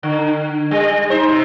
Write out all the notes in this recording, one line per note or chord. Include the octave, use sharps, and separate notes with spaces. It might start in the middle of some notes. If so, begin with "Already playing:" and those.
D3
G3
D#4 C5
C3